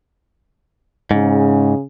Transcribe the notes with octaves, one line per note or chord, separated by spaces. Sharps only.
G#2 C#3